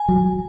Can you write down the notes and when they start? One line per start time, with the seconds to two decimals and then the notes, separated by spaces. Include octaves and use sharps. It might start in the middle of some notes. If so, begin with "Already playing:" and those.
Already playing: G#5
0.08 F#3